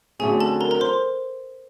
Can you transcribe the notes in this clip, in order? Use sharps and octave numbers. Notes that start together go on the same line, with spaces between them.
F2 D3 F#3 A3 C#4 G#4 G#5
A4 A5
A#4 A#5
A#4 A#5
C5 C6